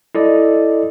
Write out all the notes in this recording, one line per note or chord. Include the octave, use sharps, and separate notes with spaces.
E4 A4 D5 D#5